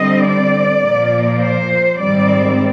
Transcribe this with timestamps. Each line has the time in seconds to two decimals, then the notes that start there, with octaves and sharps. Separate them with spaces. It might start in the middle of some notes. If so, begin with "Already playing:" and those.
Already playing: D3 G3 C4 D#5
0.25 D5
0.83 A#2 F3 A#3
1.40 C5
1.97 G#2 D#3 G3 C4 D5